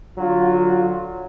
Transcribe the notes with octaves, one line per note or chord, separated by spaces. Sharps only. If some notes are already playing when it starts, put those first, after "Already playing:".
D3 F#3 F4